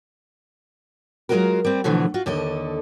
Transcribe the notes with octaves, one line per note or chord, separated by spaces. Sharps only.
F#3 G#3 C4 F4 F#4 A#4
G3 C4
B2 D3 E3 F3 A3
F4 F#4
D#2 D3 A4 D#5